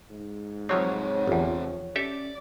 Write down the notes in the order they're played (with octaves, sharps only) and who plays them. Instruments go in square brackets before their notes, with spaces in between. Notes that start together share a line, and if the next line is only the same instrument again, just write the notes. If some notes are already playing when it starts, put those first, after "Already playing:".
[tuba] G#2
[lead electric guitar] F2 C3 [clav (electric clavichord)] F3 F#3 C4 [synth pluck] C#5 F#5
[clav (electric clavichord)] G1 E2 [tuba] F3
[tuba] C#4 [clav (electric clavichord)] G4 A4 E5 [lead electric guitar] D5